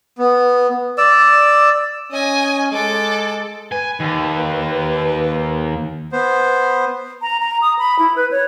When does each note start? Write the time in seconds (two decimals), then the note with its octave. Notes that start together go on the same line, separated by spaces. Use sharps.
0.18 B3
0.98 D5 E6
2.12 C#4 D#5 G#5
2.72 G#3 A4 D6
3.72 B4 G#5
4.00 D#2
6.12 B3 C5
7.22 A#5
7.40 A#5
7.62 D#6
7.79 B5
7.99 E4
8.16 B4
8.31 C#5